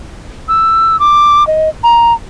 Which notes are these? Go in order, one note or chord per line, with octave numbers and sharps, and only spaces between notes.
E6
D6
D#5
A#5